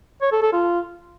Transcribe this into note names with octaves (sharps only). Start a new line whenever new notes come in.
C#5
A4
A4
F4